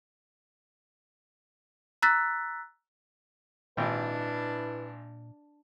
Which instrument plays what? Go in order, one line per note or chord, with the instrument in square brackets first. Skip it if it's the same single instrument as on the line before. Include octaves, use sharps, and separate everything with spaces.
[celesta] A#5 E6 F#6 A6 B6
[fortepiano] G#1 G5 [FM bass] A#2 [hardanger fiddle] D4 [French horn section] E4 B4